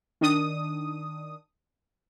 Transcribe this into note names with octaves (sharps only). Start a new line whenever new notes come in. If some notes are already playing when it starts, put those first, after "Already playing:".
D#3 D4 D#6